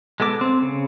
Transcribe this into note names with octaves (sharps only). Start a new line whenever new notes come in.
G#3 B3 A4 D6
C4
C#3